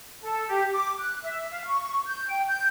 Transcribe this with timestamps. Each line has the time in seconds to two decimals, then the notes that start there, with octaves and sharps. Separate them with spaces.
0.22 A4
0.49 G4
0.72 D6
1.00 F#6
1.23 E5
1.51 F5
1.65 C#6
2.06 G6
2.27 G5
2.47 G6